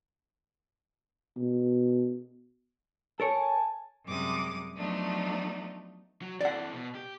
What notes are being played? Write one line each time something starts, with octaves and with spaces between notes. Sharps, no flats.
B2
A4 A#4 C#5 G#5 A5
F#2 C3 G3 G#3 D6 D#6
F3 F#3 A3 B3 D4 D#4
F#3
E3 C4 D5 F#5
B2
G4